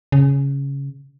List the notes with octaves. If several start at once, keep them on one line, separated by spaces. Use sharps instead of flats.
C#3